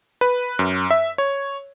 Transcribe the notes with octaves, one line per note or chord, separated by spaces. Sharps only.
B4
F#2
E5
C#5